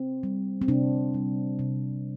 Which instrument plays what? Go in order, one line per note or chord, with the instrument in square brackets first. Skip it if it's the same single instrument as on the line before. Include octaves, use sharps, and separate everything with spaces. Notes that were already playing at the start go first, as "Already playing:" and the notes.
Already playing: [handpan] C4
G3
C4
C3 D4
G3
C3